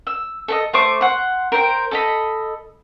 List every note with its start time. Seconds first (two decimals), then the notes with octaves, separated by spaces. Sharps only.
0.07 E6
0.48 A4 B4 D#5
0.73 A3 C5 C#6 D6
1.01 F#5 C6
1.52 A#4 C5 G5
1.91 A4 D#5 B5